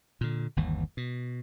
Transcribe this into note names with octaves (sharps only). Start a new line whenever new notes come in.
A#2 D3
G1 D#2 E3
B2